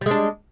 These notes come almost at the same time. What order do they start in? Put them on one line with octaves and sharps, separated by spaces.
G3 G#3 D4